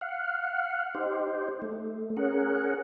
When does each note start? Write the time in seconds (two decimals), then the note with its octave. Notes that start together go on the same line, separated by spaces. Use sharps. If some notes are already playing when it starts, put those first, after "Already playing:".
0.01 F5 F#5
0.95 D#4 G4 C5
1.62 A3
2.17 C#4 G#4 A#4 F#5